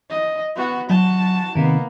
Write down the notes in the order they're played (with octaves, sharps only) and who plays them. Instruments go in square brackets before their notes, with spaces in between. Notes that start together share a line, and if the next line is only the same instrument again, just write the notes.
[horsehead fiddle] D#5
B3 F#4
[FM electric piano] F#3 [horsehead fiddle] F#4 A5
[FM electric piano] C3 D#3 [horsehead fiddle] A#3 B3